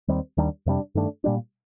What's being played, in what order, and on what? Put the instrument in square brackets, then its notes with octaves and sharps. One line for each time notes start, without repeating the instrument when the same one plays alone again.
[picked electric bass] D#2 D#3 G3 C4
D#2 D#3 G3 D4
F2 C3 G3 D4
G2 D#3 A3 D4
A#2 G3 D4